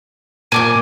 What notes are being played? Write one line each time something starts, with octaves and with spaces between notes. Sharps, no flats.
A#2 G#5 D6 G6